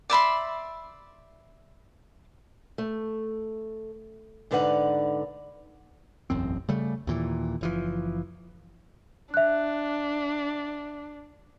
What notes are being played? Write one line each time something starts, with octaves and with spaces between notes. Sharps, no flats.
D5 E5 B5 C6
A3
G#2 D3 D#4 B4 D5 F#5
E1 A1 F#2 C4
C#3 G3 A3
D#2 A#2 E3
F#1 E3 F3
D4 E5 F#6